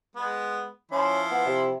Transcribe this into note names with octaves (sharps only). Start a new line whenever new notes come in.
G#3 B3
F3 C#4 E4 C6
B3
C3